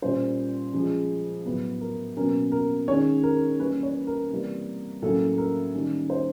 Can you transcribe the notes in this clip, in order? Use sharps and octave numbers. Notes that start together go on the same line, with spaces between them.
A#2 G3 A#3 C#4 C5
C#3 F3 G#3
A2 F#3 B3
A#4
B2 F#3 A#3 C#4 A#4
A#4
D#3 G#3 C#4 C#5
A#4
E3 G3 A#3 C#4 B4
C#5
A#4
C3 E3 G3 A#3
A2 F#3 A#3 C#4 A4
A#4
D#3 G3 A#3 C#4
C5